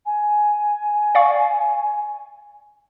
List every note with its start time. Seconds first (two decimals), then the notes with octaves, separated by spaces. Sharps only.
0.06 G#5
1.15 D5 F5 C#6